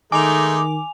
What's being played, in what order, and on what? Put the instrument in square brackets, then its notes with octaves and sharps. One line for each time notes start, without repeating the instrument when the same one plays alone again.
[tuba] D#3 [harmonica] G#3 A3 D#4 [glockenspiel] G#5 F7 [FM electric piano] D6